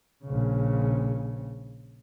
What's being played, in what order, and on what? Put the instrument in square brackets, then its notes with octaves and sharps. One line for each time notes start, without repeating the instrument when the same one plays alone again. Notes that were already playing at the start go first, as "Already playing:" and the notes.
[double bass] A#1 C#3